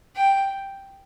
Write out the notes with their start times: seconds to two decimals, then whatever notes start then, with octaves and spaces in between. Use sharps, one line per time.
0.16 G5